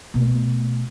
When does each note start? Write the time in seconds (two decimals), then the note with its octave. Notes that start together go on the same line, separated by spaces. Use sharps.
0.14 B2 A3